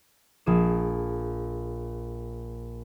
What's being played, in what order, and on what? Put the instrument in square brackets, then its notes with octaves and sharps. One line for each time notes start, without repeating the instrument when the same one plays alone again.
[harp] A#1 G#4 D#7 E7